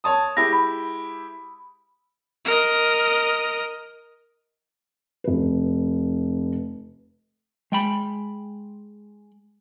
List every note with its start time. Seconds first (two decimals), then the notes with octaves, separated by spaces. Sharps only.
0.04 C#5 A5 D#6
0.37 G#3 E4 G4 A#6
0.53 B5
2.45 A#4 D#5
5.24 F1 B4
7.72 G#3 G5 B5